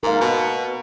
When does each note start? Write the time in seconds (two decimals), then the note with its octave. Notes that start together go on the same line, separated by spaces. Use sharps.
0.03 G#2 A#4 F5
0.21 B2